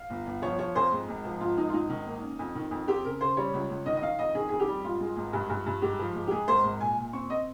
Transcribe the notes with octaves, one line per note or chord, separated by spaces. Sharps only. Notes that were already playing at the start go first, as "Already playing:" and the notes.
Already playing: F5
G1
G1
F3 C#5
F3 C#5
F2 C5
G#2
G#1
F3
G#1 F4
G#1 D#4
F4
G#1 D#4
D#3
A#3
C#4
F2
D#3
F2
C4 G4
C#3 A#4
C#3 C5
G3 C#5
C#2
C#2
D#3 D#5
D#5
D#3 F5
F2 D#5
D#3 G#4
F2 G#4
G4
G3
G#1 F4
G#3
G#1
G2
G2
G2
G#2 G4
F3
G#2
G4
G#2 G#4
G#1 C5
G#2
A#2 G#5
A#2
C4 C#6
C4 D#5